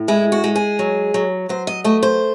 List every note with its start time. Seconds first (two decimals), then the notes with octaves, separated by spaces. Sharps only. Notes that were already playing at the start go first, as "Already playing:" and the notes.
Already playing: A2
0.08 G#3 E4
0.32 F#4
0.44 G#3
0.56 G#4
0.79 F#3
1.14 F#3
1.49 F#3 C5
1.67 D#5
1.84 A3 D#5
2.03 C5